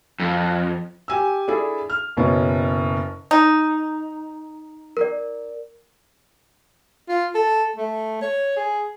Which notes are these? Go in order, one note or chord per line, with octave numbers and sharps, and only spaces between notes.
F2
G4 G#5 E6
D4 E4 G#4 A4
F6
F#1 B2 C#5
D#4
A#4 D5
F4
A4
A3
C#5
G#4